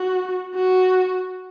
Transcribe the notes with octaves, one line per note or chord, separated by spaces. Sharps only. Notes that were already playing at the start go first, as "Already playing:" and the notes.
Already playing: F#4
F#4